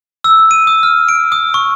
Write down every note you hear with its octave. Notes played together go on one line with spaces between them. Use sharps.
E6
D#7
D#6
F6
D7
D#6
C#6